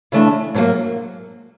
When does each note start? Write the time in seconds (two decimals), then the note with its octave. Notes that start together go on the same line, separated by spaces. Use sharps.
0.12 C#3 E3 A3 D4
0.54 G#2 D#3 F#3 A#3